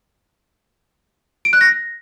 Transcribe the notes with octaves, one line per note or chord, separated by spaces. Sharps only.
D7
F#6
A#6